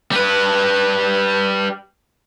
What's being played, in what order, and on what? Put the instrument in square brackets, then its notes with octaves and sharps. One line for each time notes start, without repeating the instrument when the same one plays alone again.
[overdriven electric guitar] G3 B4